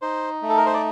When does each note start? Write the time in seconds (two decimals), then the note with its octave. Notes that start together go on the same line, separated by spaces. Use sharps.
0.02 D#4 C5
0.42 A3
0.49 A4
0.57 A#4
0.66 C5
0.74 D5